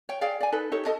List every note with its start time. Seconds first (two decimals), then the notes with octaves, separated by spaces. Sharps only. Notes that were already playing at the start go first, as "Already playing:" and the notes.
0.09 C#5 G5
0.21 G#4 D5 F5 G5
0.41 D5 G#5
0.52 D#4 A4 B4
0.72 D#4 G4 A4 C#5
0.86 A4 D#5 A5